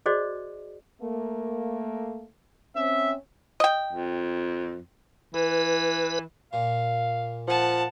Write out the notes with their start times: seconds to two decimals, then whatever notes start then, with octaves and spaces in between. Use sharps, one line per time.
0.06 F#4 G#4 C5 D5 D#5
1.02 A3 A#3
2.76 C4 C#4 E5
3.60 D#5 G5
3.92 F2
5.34 E3 B4
6.53 A#2 F5
7.48 F3 F#5 A5